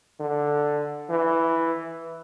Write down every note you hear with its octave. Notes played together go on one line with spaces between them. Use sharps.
D3
E3